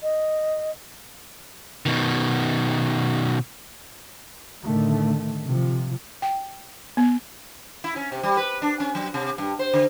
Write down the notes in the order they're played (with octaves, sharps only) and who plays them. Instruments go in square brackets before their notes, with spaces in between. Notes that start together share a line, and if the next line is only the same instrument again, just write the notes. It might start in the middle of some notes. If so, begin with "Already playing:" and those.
[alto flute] D#5
[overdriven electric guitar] B2 D#3
[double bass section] A2 D3 D#3 A3
C3 F3
[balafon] G5
B3
[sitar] E4
C#4
C3
G3
B4
D4
C#4
F#3
C3
G2
C5
D3